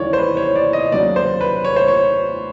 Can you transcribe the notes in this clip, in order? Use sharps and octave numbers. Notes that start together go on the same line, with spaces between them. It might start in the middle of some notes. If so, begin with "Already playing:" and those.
Already playing: D#2 C#3 E3 G3 C#5 D5
C5
B4
C#5
D5
D#5
D#2 C#3 F#3 D5
C5
B4
C#5
C5
C#5